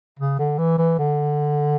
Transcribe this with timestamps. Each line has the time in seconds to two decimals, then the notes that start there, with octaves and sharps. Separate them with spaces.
0.19 C#3
0.39 D3
0.58 E3
0.78 E3
0.99 D3